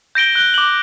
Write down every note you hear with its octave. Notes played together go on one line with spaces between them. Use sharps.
G6 A#6 D7 G7
F#6 G7
D6 F#7